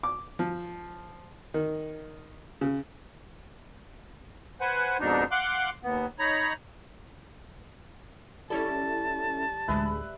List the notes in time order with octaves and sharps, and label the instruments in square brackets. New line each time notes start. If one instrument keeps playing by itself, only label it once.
[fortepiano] D6
F3
D#3
C#3
[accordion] B4 C5 F#5 G#5
F2 G#2 B2 D4 D#4
F5 F#5 C6 D6 F#6
D#2 B3
D#4 C#5 A#5 B5
[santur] G3 [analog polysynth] C#4 E4 A4 [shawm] A5
[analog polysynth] A1 D2 G#3 [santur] B4 E5